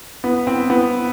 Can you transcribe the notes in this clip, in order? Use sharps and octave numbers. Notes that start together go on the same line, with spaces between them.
B3
C4
B3